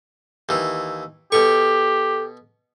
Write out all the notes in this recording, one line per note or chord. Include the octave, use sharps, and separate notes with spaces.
D#2 E3
B2 G4 A4 C#6